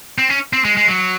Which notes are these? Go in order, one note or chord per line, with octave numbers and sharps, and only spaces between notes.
C4
C#4
C4
G#3
G#3
F#3